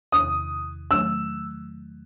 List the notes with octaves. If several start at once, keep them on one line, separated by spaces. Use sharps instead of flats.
E2 C3 D#3 D#6
D#3 F#3 A3 E6